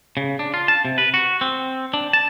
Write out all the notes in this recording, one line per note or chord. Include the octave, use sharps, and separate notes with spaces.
C#3
D4
F4
A5
C3
B4
F#4
C4
D4
A5